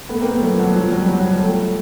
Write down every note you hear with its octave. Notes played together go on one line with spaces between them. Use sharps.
A3 B3
A#3 C4
A3 B3
F#3
F3
F#3
F3
F#3
F3
F#3
F3 G3
F#3
F#3
F3 G3
G3 A3